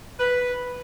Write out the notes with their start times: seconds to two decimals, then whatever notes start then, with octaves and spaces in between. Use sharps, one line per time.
0.19 B4